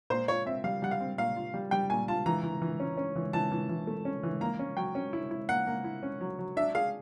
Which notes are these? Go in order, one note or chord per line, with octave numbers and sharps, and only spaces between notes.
A#2 C5
F4 C#5
C4 E5
G3 F5
G3 F#5
F5
C4
A#2 F5
F4
G3
G3 G5
A#2 G#5
F4 A5
E3 A#5
E3
E3
C#4
C#4
E3
E3 A5
E3
E3
A3
C#4
E3
A#3 A#5
C#4
F#3 G5
C#4
E4
E4
A#3 F#5
A#3
E4
C#4
F#3
F#3
D4 E5
G#4 F5